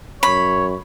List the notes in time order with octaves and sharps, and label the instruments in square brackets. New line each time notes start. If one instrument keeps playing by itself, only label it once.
[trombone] F#2 [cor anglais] C#5 [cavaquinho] B5